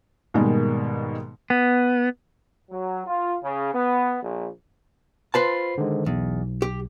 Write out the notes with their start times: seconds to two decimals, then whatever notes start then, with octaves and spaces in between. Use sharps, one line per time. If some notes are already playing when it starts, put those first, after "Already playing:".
0.34 G#2 B2 D#3 G3 G#3 A#3
1.50 B3
2.70 F#3
3.07 F4
3.42 C#3
3.74 B3
4.22 A#1
5.34 F4 B4 C5 A5 B5 C7
5.78 D3 D#3 G#3
6.06 B1 E2
6.62 G4